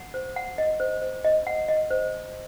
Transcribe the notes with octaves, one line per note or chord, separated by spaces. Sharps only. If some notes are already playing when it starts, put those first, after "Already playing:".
Already playing: F#5
C5
F#5
D#5
C5
C5
D#5
F#5
D#5
C5